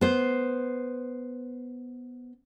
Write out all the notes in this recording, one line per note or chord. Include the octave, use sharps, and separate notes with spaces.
B3 C5